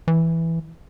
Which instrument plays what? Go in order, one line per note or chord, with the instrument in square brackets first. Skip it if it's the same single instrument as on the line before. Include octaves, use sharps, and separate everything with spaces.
[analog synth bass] E3